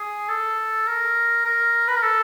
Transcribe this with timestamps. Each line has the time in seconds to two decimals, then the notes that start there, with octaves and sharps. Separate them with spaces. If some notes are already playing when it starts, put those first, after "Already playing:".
Already playing: G#4
0.29 A4
0.87 A#4
1.45 A#4
1.88 B4
1.96 A#4
2.03 A4